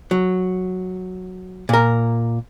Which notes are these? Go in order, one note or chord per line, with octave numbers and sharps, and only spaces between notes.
F#3
A#2 A#4